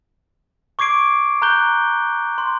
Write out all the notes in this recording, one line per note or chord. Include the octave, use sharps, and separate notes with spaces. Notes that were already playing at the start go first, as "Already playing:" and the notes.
C#6 D6 G#6 C7 D7
A#5 F#6 G6 G7
C6